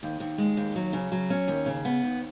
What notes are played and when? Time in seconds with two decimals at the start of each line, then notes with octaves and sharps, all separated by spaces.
0.03 D#2
0.20 D#2
0.38 G#3
0.57 D#2
0.76 F#3
0.93 C#3
1.12 F#3
1.30 C#4
1.48 D#2
1.66 C#3
1.85 B3
2.03 D#2